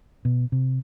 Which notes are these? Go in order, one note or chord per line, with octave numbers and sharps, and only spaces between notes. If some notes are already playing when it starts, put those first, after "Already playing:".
B2
C3